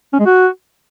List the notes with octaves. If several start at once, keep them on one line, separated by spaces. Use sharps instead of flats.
C#4
G#3
F#4